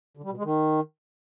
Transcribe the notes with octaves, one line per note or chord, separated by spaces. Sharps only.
D3
G3
B2
G#3
D#3